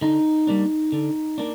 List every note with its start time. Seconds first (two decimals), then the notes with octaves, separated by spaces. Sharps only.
0.01 D3 D#4
0.47 G3 A#3 D4
0.92 D3
1.38 A#3 D4